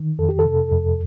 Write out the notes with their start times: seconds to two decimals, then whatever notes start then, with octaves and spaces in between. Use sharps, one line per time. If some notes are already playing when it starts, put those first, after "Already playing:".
Already playing: D#3
0.19 F2 A4
0.29 G4
0.39 A4
0.45 C3
0.72 F2